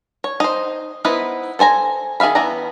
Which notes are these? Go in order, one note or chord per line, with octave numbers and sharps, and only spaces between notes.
C#5
D#4 C5
B3 D#4 E4 B4 C5
A4 C5 G#5 A#5
D#3 G#4 E5 F5 B5
E3 B3 G5 A#5